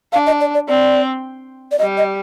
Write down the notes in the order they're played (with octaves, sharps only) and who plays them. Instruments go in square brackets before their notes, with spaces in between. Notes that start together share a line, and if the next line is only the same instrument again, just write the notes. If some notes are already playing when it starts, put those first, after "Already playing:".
[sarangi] D4 [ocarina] F5
[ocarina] D#5
D5
D5
[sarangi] C4 [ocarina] D5
[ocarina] D5
[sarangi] G3 [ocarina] D#5
[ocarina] D#5